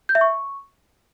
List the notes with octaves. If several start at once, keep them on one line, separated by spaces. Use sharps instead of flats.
G6
E5
C#6